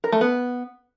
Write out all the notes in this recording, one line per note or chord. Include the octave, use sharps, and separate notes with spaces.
A#4
A3
B3